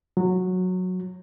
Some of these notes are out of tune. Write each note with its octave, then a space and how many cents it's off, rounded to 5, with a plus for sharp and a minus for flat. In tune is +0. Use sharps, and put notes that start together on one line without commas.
F#3 -10